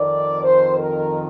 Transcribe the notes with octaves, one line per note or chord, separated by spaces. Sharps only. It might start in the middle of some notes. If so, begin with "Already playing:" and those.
Already playing: F2 D#3 D5
C5
A#4